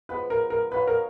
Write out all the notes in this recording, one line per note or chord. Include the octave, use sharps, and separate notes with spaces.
F3 G#3 B3 B4
A#4
A#4
D#4 F#4 B4 C#5 F5
A#4